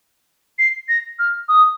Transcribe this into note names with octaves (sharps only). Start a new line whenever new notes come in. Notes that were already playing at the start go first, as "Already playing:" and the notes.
C7
A#6
F6
D#6